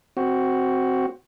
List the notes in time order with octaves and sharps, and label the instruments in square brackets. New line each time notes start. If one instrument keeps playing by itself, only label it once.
[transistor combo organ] C4 F#4